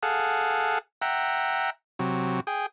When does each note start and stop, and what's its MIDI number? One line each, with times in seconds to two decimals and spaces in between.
0.03 0.78 68
0.03 0.78 69
0.03 0.78 77
0.03 0.78 78
1.02 1.70 76
1.02 1.70 78
1.02 1.70 79
1.02 1.70 82
1.99 2.40 48
1.99 2.40 54
2.47 2.66 68
2.47 2.66 79